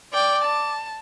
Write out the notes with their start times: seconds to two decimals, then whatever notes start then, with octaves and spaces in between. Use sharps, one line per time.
0.13 D5 G5 D6
0.44 A5